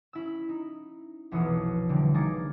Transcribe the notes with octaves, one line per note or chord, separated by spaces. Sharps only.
C#4 E4 E6
D#4
F1 B1 E3 B3 F4 D#6
D3 E3 G3
A#3 D#4 G#4 D6 A6 C#7